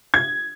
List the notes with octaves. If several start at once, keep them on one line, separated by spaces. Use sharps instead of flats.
G#6